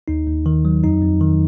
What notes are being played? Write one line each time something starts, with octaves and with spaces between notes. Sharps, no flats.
D#2 D#4
D#2
D#3
F#3
F2 D#4
F2
D#3